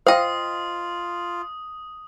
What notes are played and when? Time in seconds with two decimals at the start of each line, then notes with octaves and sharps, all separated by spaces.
0.07 F4 C5 D#5 F5 G5 D#6